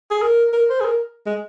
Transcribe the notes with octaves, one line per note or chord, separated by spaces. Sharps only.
G#4
A#4
A#4
C5
G#4
A#4
G#3